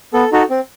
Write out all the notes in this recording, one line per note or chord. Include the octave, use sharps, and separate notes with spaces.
B3 A4
D#4 F#4 A4
C4